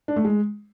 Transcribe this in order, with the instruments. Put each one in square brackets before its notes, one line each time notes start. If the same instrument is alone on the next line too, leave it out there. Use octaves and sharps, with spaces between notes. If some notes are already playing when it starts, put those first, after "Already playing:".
[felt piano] D4
A3
G#3